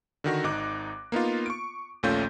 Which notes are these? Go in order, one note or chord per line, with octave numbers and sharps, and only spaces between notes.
D3 D#3 F#4 A#6
G#1 D#4 D6 F#6
A#3 B3 D#4 F4
C#6 D7
A#1 D#2 A3 C#4 F4 G6